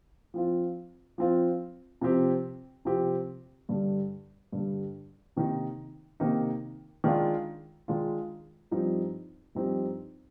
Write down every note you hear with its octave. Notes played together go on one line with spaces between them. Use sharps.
F3 C4 F4
F3 C4 F4
C3 F3 C4 G4
C3 F3 C4 G4
G2 D3 G3
G2 D3 G3
C3 D#3 A#3 D#4
C3 D#3 A#3 D#4
D#3 G#3 D4 F4
D#3 G#3 D4 F4
G2 F3 C4 D#4 G4
G2 F3 C4 D#4 G4